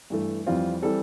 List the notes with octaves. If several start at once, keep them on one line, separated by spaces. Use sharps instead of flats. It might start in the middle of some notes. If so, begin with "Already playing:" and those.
G2 E3 A3
F2 E3 G3 C4 F4
E3 G3 C4 A4